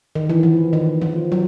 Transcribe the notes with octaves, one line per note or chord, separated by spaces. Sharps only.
D#3
E3
F3
D#3
F3
F#3